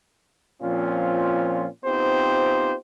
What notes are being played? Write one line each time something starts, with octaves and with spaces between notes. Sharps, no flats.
A#2 F3 C4 C#4 F4
B3 C4 D#4 F4 G4 C5